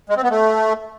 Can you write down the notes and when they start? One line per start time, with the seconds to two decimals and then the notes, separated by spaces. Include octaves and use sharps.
0.09 G#3
0.17 C4
0.24 B3
0.31 A3